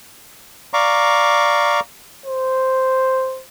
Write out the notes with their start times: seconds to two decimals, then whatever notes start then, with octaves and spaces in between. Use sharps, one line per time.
0.74 D5 F5 A#5 C#6 D6
2.26 C5